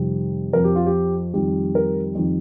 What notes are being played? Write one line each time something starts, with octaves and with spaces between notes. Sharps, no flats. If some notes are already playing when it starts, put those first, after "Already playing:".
Already playing: F2 C3 D#3 G3
F2 F3 A#4
G4
F4
G4
F2 D#3 G3
A#4
F2 D#3 G3